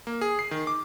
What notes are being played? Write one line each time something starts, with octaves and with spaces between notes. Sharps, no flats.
A#3
G#4
C7
D#3
D6